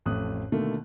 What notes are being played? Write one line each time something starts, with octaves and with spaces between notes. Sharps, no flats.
A1 F2 A3 D#6 F#6
B2 D3 D#3 A3 A#3